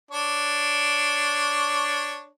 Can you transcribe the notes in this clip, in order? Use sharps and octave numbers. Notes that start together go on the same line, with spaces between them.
D4 C#5